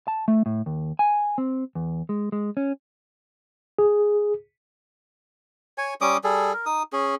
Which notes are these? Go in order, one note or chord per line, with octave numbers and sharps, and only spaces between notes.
A5
A3
A2
D#2
G#5
C4
E2
G#3
G#3
C#4
G#4
C#5 G#5
G3 C#4 D6 D#6
G3 G#4 A4
A#4
D#4 D#6
C#4 G#4